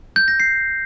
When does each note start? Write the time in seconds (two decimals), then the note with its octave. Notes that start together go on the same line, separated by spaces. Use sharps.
0.16 G6
0.28 A#6
0.40 C7